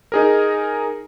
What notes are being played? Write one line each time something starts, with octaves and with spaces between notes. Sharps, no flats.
D#4 G#4 A#4